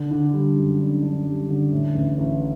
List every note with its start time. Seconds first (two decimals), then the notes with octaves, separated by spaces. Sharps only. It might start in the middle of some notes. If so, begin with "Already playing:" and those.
Already playing: D3
0.11 D3
0.33 G3
0.56 F#2
0.80 D4
1.02 D4
1.26 G3
1.49 D3
1.72 A2
1.95 A1
2.18 A1